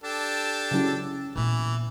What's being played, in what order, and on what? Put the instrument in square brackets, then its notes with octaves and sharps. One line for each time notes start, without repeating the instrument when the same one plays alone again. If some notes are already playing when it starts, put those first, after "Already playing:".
[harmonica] D4 G4 A4
[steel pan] C#3 F#3 E4
[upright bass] A#2 B3 [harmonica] E3